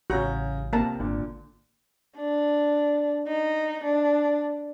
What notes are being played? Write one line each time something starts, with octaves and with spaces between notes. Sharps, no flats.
A1 C#3 C#4 F#4 A#5 G6
C3 A#3 A#4 A5
G#1 A#2 D3
D4
D#4
D4